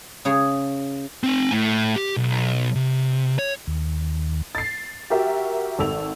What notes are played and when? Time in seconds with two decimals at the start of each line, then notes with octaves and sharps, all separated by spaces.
0.25 C#3 G#4 C#5
1.23 C4 G#5
1.52 A2
1.96 G4
2.17 B1
2.75 C3
3.39 C#5
3.67 D#2
4.55 A6 C7
5.10 F#4 G4 A#4 E5
5.79 G#1 A4 E6 F7